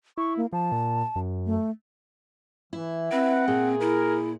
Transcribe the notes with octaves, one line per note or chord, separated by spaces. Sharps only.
E4 C#6
A#3
F3 A5
A#2
F#2
A3
E3 E4
C4 B4 F#5
A#2 G#4
E4 A#4